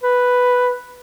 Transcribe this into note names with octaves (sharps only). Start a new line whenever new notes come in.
B4